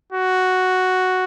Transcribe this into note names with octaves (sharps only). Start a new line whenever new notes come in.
F#4